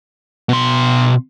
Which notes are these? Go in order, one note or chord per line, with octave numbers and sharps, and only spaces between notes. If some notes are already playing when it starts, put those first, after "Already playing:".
B2 C6